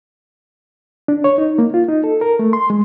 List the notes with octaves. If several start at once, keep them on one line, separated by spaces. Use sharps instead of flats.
D4
C#5
D#4
A#3
F4
D#4
A4
A#4
A3
C6
G#3